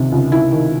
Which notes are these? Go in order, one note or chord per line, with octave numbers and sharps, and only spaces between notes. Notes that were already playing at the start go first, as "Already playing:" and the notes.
Already playing: C#2 C3 D#3
C#2
C#2 E4
D#3